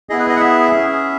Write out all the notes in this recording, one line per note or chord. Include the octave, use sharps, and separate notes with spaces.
B3 E4 G#4 D#5
B4
D#5
F#5
E5
C#4 G#4